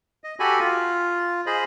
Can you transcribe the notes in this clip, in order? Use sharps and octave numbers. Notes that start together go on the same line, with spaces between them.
D#5
F#4 G4 A4 G#5 B5
F4
G#4 C5 D#5 B5